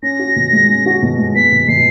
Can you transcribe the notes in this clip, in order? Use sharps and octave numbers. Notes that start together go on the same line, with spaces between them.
C#4 A#6
F#4
B2
G#3
C#4
F#4
B2
G#3
B3 B6
B2
B2 C7